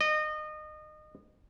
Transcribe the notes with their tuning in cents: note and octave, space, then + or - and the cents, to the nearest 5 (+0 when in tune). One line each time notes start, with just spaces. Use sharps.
D#5 -25